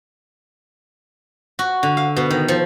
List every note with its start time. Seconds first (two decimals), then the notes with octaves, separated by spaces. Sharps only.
1.59 F#4
1.83 D3
1.97 F5
2.16 B2
2.31 D#3
2.48 F3